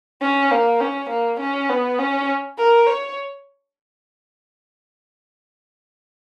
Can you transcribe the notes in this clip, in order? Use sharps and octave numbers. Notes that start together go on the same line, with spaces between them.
C#4
A#3
C#4
A#3
C#4
B3
C#4
A#4
C#5